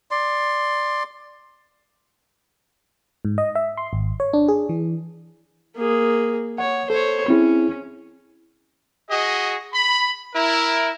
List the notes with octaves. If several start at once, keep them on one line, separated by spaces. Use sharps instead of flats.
D5 C6
G#2
D#5
E5
C6
G#1
C#5
D4
G#4
E3
A#3 G#4
C#5 F#5
A4 C5 C#5
C4 C#4 E4 G#4
F#4 G#4 D#5
B5
E4 A#4